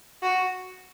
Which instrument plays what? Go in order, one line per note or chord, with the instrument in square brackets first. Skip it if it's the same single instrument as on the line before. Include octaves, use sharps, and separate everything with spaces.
[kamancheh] F#4